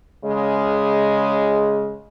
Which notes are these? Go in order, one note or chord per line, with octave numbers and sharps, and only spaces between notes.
C#3 G#3